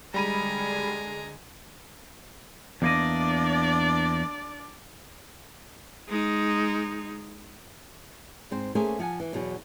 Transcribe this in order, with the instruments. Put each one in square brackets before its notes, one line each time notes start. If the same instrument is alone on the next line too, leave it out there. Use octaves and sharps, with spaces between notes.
[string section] D3 G#3 [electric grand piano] G3 B5 D#7 [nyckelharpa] G#5 [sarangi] A#5
[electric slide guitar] E2 A#3 D#5 [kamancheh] D4 D5
[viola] G#3 D#4
[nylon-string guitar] G#2 C4 C5
A3 A#3 C#4 G#4 A#4 C5
F3 F#5 G#5
E3
E2 B2 F#3 B3